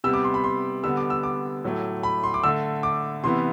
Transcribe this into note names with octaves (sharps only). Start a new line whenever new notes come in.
C3 G3 B3 E6
D6
C6
B5
C6
D3 G3 B3 E6
D6
E6
D6
A2 F#3 A3
B5
C6
D6
D3 A3 E6
D6
C3 E3 B3 C6